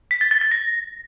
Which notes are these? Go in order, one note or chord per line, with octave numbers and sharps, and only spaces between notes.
B6
A6
A6
A6
A#6